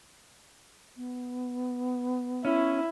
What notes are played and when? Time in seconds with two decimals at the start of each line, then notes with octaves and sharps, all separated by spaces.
0.97 B3
2.45 C#4 E4